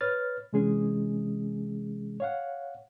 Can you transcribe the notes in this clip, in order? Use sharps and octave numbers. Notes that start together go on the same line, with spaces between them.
B4 C#5 F6 A6
C3 E3 G#3 C#4 G#4
C#5 F5 F#5